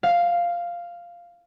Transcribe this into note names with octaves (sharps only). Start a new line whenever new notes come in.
F5